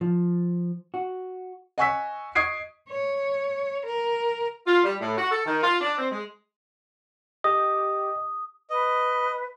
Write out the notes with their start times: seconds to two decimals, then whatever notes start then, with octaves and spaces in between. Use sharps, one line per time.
0.01 F3
0.94 F#4
1.78 D#5 F#5 G#5 C#6 E6 B6
2.35 D#5 C#6 D#6 G#6 C7 D7
2.90 C#5
3.86 A#4
4.67 F4
4.84 G3
5.00 A2
5.18 F#4
5.31 A4
5.46 D#3
5.63 F4
5.81 D4
5.98 C4
6.12 G#3
7.44 G4 D#5 D#6
8.70 B4 D#5